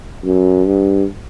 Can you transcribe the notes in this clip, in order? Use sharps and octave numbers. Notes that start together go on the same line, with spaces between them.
F#2
G2